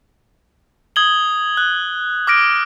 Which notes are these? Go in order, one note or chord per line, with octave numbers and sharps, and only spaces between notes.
D#6 G#6 F#7 G7
F#6
D6 F6 A#6 D7